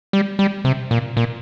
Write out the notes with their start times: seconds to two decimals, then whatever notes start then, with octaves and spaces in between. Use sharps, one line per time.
0.13 G3
0.39 G3
0.65 C3
0.91 A#2
1.17 A#2